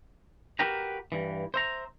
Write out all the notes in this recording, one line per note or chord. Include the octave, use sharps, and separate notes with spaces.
F#4 G4 A#4 B4 G5 A#5
G2 E3
C5 E5 A#5